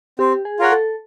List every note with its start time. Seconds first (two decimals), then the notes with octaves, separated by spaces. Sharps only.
0.19 C4 G4
0.45 G#4
0.59 F4 A#4 C#5 F#5
0.72 A4